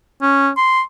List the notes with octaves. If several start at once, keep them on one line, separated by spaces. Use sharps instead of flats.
C#4
C6